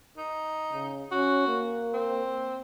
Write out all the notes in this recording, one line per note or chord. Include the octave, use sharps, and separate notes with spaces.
D#4
C#3
C#4 F#4
A#3
C4